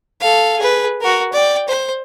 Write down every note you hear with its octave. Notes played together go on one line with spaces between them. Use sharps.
A4 F5
G#4 B4
F#4 A#4
D5 G5
C5